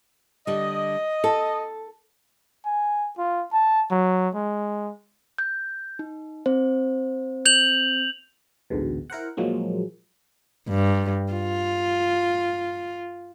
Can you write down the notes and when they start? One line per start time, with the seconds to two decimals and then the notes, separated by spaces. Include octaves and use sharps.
0.47 D3 G3 D#5
1.24 A4
2.66 G#5
3.18 F4
3.53 A5
3.91 F#3
4.35 G#3
5.38 G6
5.99 D#4
6.46 C4 C5
7.45 G6 F7 F#7
8.70 A1 D2 G#2 B2
9.10 E4 A#4 C5 F#5
9.37 A#2 F3 F#3 G#3 A#3
10.68 G2
11.33 F4